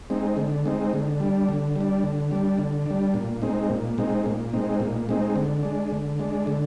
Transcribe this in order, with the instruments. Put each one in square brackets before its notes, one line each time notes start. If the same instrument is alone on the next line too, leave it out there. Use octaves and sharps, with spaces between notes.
[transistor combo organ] G#3 C4 D#4
D3
G#3 C4 D#4
D3
G3 D4
D3
G3 D4
D3
G3 D4
D3
G3 D4
A#2
G#3 C4 D#4
A#2
G#3 C4 D#4
A#2
G#3 C4 D#4
A#2
G#3 C4 D#4
D3
G#3 D4
D3
G#3 D4
D3